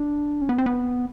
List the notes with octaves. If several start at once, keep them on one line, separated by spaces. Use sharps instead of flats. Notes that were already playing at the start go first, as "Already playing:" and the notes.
Already playing: D4
C#4
B3
C4
B3